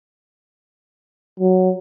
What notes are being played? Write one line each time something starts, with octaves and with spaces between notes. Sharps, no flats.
F#3